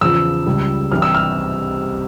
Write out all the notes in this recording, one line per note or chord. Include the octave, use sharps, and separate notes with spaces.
E2 C#3 F3 E6
C#2 C#3 G3
C2 C3 E3 G3 F6
E6
F6